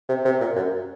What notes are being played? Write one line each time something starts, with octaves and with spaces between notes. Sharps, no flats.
C3
C3
A#2
F#2